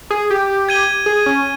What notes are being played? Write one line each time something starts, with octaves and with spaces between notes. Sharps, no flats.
G#4
G4
G#6 D#7 G7
G#4
C#4